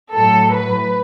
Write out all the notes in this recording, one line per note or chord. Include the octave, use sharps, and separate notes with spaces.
A2 F#3 A4
B4